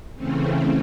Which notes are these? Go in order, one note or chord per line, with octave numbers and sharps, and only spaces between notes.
C#3 E3 A3 C4 C#4